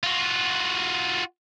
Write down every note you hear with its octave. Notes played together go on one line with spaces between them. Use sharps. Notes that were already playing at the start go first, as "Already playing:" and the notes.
F4 F#4